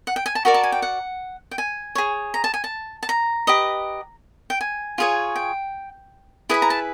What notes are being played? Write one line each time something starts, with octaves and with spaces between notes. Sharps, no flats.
F#5
G5
G#5
A5
F#4 A#4 D5 A#5
A5
G#5
G5
F#5
G5
G#5
G#4 C#5
A#5
A5
G#5
A5
A5
A#5
G4 B4 D#5
G5
G#5
F4 G#4 C#5
G5
E4 G#4 B4 D#5 B5
A#5
A5